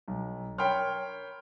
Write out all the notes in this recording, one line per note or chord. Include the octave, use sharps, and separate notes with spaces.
B1
A#4 C#5 G5 B5 C6 F6